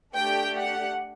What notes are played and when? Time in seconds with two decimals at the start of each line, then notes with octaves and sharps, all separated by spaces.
0.15 A3 D4 G4 G5
0.57 F#5